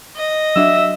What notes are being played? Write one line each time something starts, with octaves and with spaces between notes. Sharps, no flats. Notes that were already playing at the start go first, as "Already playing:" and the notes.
D#5
F#3 D4 F#4 E5 E6